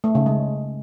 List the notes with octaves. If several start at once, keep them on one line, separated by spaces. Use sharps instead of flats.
A3
C#3
G#3